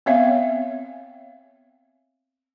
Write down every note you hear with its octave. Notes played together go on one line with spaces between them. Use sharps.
B3 C4 C#5 E5 F5